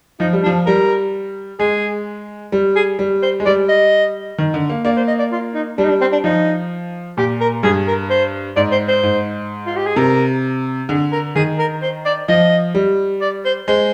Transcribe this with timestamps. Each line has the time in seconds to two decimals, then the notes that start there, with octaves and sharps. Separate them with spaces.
0.20 F3 D#4
0.33 G3
0.43 D4
0.46 F3
0.66 G3 A#4
1.59 G#3 G#4
2.52 G3
2.76 G#4
2.99 G3
3.22 C5
3.40 G#3
3.46 G3 D5
3.69 D#5
4.38 D#3
4.54 D3
4.70 A#3
4.85 A#3 D5
4.97 C5
5.08 D#5
5.19 D5
5.32 F4
5.54 D#4
5.78 G3 D4
5.84 D#4
5.89 D4
6.01 C4
6.12 D4
6.24 F3 D#4
7.17 A#2 G4
7.41 A#4
7.63 G2 G#4
7.87 A#4
8.10 C5
8.56 G#2 D5
8.72 C5
8.88 C5
9.03 G#2
9.66 F4
9.77 G4
9.86 G#4
9.96 C3 A#4
10.89 D3 G#4
11.12 A#4
11.35 D#3 G#4
11.59 A#4
11.82 C5
12.05 D5
12.28 F3 D#5
12.75 G3
13.21 D5
13.45 C5
13.68 G#3 C5